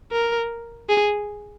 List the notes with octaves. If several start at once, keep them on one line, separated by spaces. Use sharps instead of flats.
A#4
G#4